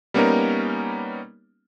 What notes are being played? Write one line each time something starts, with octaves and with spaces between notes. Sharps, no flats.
G3 A#3 B3 C#4 D#4 A#4